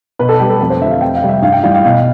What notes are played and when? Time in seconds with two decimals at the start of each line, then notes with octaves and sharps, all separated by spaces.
0.19 B2 B4
0.29 A4
0.40 G3 G4
0.49 A4
0.60 F2 A4
0.70 C5
0.81 D3 F3 E5
0.91 F5
1.01 F2 G5
1.15 F5
1.22 C3 G3
1.29 E5
1.42 G2 F5
1.53 G5
1.63 E3 G3 F5
1.74 F5
1.85 B2 F5